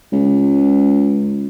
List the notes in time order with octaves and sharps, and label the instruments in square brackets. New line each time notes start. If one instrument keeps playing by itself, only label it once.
[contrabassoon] C#2